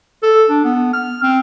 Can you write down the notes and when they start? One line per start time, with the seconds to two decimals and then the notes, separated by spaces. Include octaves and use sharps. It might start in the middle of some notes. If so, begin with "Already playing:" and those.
0.23 A4
0.49 D4
0.64 B3
0.93 F6
1.23 C4